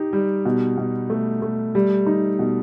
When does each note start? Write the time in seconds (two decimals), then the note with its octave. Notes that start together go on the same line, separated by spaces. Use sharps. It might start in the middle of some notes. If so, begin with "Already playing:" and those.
Already playing: D#4 G4
0.13 G3
0.45 B2
0.78 B2
1.10 A3
1.42 A3
1.75 G3
2.06 D#4
2.39 B2